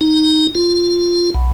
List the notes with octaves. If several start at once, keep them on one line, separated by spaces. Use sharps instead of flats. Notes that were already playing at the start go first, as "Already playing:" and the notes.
D#4
F4
B1